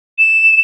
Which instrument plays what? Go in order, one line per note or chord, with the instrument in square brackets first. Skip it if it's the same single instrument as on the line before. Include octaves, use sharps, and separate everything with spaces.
[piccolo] E7